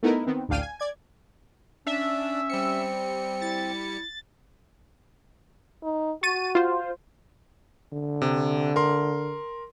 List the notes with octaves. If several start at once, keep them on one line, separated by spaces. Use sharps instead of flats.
A3 B3 D#4 E4 A#4 B4
D#3 B3 C4
A1 D2 D4 F5 G5 D#7
G#5
D5 G#6
C#4 D4 E5
G3 C4 C#7
E4 A6
D#4
F#4 C#6 A6 D#7
F4 C5
D3
C3
A#4 C6